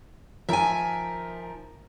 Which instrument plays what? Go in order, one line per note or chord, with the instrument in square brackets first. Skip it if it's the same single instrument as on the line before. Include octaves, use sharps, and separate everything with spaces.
[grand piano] D#3 F3 A#4 [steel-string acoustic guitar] E5 G#5